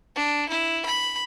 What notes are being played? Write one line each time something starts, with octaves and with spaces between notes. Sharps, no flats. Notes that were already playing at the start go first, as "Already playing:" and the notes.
D4
E4
B5